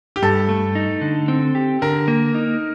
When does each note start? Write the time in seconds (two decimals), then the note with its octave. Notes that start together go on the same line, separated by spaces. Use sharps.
0.16 G4
0.22 G2 A4
0.49 A3
0.75 D#4
1.01 D3
1.28 C4
1.55 G4
1.82 D3 A#4
2.08 A#3
2.35 D#4